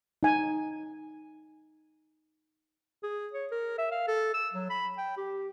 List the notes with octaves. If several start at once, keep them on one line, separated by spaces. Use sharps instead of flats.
D#4 G#5
G#4
C#5
A#4
E5
F5
A4
E6
F#3
B5
G5
G4